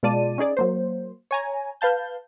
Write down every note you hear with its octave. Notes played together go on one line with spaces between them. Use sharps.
B2 G#3 F4 D5 A5 D#7
C#4 D#4 G#4 D5
F#3 A#3 C5
C#5 G#5 A#5
B4 F5 A5 G6